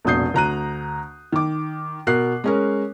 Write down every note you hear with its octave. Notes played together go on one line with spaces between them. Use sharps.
F1 A#1 B2 D#6 G6 C7
D2 A#5 F#6 D#7
D#3 D6
B2 A#4 F#6 C7
G#3 C#4 A#4